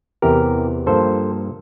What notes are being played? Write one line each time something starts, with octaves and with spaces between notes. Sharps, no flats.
E2 C3 E3 G4 A#4
G2 F3 A#3 A4 C5